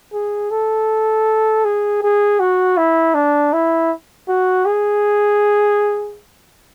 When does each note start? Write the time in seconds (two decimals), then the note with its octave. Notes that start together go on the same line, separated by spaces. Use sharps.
0.13 G#4
0.51 A4
1.65 G#4
2.03 G#4
2.40 F#4
2.77 E4
3.15 D4
3.53 E4
4.28 F#4
4.66 G#4